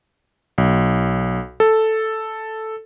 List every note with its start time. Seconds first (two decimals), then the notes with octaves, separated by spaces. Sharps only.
0.58 B1
1.60 A4